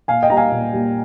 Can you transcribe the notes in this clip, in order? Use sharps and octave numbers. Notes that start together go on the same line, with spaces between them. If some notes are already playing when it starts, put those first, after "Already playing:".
A#2 F5 G#5
D#5 G5
G3 A#3 A#5
F5 G#5
A#2
G3 A#3